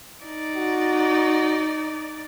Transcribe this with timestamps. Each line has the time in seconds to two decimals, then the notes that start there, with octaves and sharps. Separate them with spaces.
0.25 D#4 D5
0.56 F#4